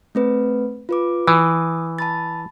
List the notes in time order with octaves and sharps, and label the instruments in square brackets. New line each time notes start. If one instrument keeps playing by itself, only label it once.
[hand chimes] A3 C4 B4
F4 B4 D6
[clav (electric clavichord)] E3 [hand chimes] D#6
[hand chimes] A5 B5 A6